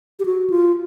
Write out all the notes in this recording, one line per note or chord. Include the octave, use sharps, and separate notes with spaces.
G4
F#4
F4